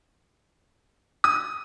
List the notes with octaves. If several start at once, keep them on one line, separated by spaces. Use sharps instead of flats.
D#6